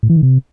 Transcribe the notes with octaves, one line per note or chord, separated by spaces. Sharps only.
A2
E3
D#3
C3